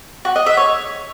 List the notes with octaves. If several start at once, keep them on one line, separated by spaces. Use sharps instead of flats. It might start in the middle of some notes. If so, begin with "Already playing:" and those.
F#4
D#5
E5
C#5